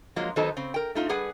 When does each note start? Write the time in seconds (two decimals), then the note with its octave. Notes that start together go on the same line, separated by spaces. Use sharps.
0.16 F3 F#3 G#3 A#3 F4
0.36 D#3 F#3 B3 D#4 A4 C5
0.57 C#3 C4
0.74 A#4 G5
0.95 A3 D#4 F4
1.09 G3 G#4 B4 F#5